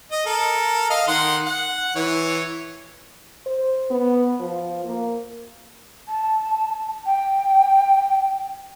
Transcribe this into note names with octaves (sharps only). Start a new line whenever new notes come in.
D#5
A4 A#4
D#5 F5
D#3 F#5 C6
F#5
E3 C#5
C5
B3
F3
A#3
A5
G5